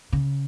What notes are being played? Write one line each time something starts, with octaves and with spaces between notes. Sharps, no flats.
C#3